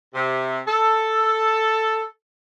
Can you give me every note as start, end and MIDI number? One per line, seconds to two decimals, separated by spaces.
0.15 0.60 48
0.68 2.03 69